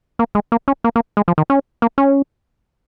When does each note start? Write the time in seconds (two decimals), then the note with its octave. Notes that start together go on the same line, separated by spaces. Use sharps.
0.19 A#3
0.35 G#3
0.52 A#3
0.68 C#4
0.84 A#3
0.96 A#3
1.17 G#3
1.28 F3
1.38 D#3
1.50 C#4
1.82 A#3
1.98 C#4